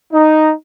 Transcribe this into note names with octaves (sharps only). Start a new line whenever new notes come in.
D#4